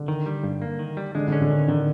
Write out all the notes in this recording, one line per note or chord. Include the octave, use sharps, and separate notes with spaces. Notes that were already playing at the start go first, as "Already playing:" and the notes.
Already playing: D3 D4
D#3
G3
G2
A#3
D#3
G3
D3 G#3 D4
D3 C#4 D4
D3 D4
D#3
D3 D#3 D4